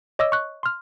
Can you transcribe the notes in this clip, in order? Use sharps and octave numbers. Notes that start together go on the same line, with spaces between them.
C#5 D#5 D6 E6
C#6 F#6
C6 F6